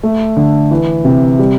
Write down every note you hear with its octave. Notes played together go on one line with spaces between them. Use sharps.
A3
D3
E3
C3
G3